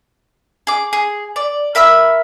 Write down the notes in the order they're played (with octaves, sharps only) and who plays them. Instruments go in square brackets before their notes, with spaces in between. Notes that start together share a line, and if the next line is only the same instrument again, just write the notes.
[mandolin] G#4 D6
G#4
D5
A#4 E5 B5 E6